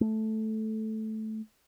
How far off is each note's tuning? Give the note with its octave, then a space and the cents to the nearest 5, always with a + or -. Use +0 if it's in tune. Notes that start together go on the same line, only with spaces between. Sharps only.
A3 -10